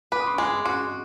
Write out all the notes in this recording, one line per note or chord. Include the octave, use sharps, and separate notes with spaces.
B4 D6
D#6
C6 D6
C#6
G#3 C6 D6
F#4 C6 D6